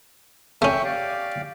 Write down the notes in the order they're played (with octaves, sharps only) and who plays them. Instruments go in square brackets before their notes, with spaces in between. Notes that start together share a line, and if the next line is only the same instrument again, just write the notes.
[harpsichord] A3 C#4 [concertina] E5 G5 C#6
[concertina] G4 D5 F5